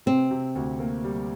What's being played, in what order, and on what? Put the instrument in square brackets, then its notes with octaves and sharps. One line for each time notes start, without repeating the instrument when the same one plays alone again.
[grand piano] C3 [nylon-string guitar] C4
[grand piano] C3
D2
A#3
G3